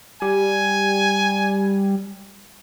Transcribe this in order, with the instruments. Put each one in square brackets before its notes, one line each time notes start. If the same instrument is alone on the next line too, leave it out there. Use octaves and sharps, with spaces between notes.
[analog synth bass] G3 [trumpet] G#5